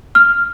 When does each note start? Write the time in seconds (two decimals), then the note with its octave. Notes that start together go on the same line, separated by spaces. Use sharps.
0.15 F6